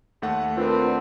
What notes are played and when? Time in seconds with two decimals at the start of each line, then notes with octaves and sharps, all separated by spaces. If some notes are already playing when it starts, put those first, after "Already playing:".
0.22 D#2 A3 F#5
0.57 C4 D4 F4 A#4 B4